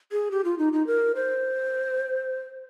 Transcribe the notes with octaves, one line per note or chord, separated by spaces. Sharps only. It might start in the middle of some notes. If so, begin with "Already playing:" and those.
G#4
G4
F4
D#4
D#4
A#4
C5